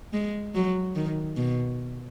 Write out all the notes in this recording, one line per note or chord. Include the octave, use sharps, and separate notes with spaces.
G#3
F#3
D#3
B2